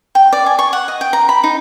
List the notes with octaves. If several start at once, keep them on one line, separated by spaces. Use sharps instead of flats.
G5
D5
G#5
C#6
F#5
D#5
G5
A#5
B5
D#4